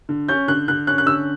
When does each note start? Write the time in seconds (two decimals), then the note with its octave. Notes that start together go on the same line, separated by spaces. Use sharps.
0.09 D3
0.28 C#4 G6
0.48 D3 F#6
0.68 D3 F#6
0.87 C#4 F#6
0.98 F#6
1.06 D3 E6